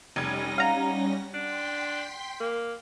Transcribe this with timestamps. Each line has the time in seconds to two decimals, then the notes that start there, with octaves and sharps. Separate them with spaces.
0.16 F1 G3 C#4 D#4 G#6 A#6
0.58 F5 F#5 A#5
1.34 D4 G5 C6 B6
2.40 A#3